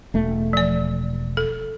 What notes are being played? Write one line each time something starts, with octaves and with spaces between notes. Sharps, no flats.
E1 A3
F3 D5
A4